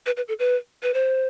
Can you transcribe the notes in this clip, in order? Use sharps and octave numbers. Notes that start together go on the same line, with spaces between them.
B4
B4
A4
B4
B4
C5